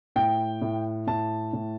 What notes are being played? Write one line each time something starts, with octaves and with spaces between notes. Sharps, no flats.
A2 G5
A2
A2 A5
A2